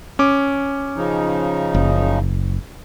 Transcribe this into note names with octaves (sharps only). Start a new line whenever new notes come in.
C#4 D6
C#3 F3 D#4
F#1